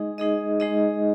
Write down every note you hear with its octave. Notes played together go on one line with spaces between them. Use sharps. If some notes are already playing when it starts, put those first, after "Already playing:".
Already playing: G#3 D#4 G#4 D#5
G#3 D#4 G#4 D#5
G#3 D#4 G#4 D#5